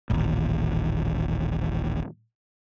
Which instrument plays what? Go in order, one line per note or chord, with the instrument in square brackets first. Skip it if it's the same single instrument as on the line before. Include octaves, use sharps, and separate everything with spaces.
[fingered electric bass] D#1 A1